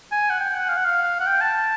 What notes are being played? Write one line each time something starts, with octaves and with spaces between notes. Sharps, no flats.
G#5
F#5
G5
F#5
F5
F#5
F5
F#5
G5
A5